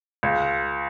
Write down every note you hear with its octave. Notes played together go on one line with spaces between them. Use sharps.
C#2